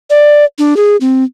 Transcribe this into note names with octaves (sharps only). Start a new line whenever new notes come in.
D5
D4
G#4
C4